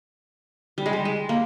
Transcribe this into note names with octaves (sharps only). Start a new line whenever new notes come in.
G3
G#3
G3
G#3
A#3